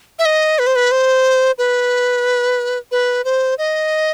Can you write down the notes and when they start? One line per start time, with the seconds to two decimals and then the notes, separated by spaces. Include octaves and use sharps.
0.19 E5
0.25 D#5
0.59 B4
0.67 C5
0.76 B4
0.91 C5
1.58 B4
2.92 B4
3.25 C5
3.58 D#5